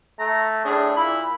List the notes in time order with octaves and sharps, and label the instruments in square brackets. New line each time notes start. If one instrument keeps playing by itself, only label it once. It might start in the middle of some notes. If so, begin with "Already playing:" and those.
[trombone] A3 [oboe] A#5
[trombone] A2 [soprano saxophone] D4 [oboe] G#4
[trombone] A#2 [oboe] E4 [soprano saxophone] B5